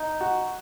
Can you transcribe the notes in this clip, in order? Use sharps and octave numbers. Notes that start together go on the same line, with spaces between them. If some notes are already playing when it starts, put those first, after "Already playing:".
Already playing: D#4
F#4